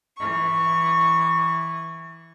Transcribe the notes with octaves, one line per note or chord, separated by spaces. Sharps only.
E3 C#6